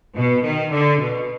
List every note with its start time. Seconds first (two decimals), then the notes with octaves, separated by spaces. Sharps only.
0.14 B2
0.42 D#3
0.70 D3
0.98 B2